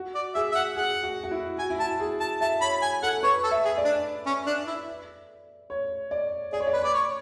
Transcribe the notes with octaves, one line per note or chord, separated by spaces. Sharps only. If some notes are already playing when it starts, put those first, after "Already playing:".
Already playing: F#4
D5
G#4 E5
E5
F#5
G#4 F#5
F#4
F#4
E4
F#4 G#5
E4
F#4 A5
G#4
A5
E5 A5
C#5 B5
G#5
A4 F#5
B4 C#5
A4
E5
G#4
D5
D4
C#4
D4
E4
C#5
D5
G#4 D5
C#5
D5
B4
C#5 D5
C#5